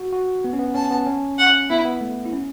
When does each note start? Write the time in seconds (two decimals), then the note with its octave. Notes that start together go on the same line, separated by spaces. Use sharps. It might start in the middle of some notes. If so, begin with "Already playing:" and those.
Already playing: F#4
0.12 F#4
0.44 B3
0.53 C#4
0.59 B3
0.75 C#4 A5
0.91 B3
1.06 C#4
1.39 F#5
1.70 B3 E4
1.85 B3
2.01 A3
2.26 E4
2.33 C#4